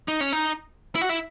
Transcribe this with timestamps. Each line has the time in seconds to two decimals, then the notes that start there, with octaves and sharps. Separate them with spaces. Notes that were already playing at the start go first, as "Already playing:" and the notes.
0.08 D#4
0.21 C#4
0.33 D#4
0.95 E4
1.02 F#4
1.09 E4